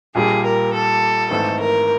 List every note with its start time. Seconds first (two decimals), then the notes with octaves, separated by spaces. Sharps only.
0.15 A#1 A#2 G3 G#4
0.43 A#4
0.72 A4
1.30 G#1 G#2 E3 A3 A4
1.60 A#4